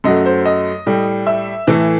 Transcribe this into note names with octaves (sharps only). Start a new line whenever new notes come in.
F#2 F#3 A3 D#5
C5
D#5
A2 G3
E5
A2 E3 A3